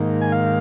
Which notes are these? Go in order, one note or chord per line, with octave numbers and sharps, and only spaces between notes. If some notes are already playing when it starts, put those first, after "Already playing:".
Already playing: G#2 D#3 A#3
G#5
F5